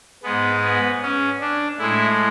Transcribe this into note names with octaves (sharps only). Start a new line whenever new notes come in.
G#2 G#3 B3
B3
C#4
D4
A2 G#3 E4